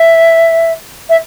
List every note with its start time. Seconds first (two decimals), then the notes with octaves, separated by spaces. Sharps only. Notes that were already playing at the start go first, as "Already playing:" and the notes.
Already playing: E5
1.09 E5